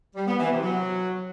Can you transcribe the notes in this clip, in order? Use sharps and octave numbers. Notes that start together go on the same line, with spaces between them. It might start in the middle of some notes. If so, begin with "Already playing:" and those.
G3
B3
E3
C3
F#3